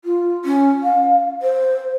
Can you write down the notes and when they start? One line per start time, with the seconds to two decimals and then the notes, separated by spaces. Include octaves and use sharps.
0.04 F4
0.45 C#4
0.82 F5
1.42 C5